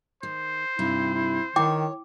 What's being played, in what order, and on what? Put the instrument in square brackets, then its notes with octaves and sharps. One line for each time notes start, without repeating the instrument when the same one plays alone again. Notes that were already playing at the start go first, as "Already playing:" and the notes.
[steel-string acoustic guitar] D#3 [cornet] C5
[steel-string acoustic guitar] G2 C3 D#4 [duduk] E4
[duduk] E4
[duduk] D#3 [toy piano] E4 G5 D6 [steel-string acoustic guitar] C#5